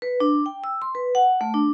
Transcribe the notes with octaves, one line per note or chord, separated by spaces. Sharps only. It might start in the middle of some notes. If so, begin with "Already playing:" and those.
B4
D4
G5
E6
C6
B4
F#5
A3
D4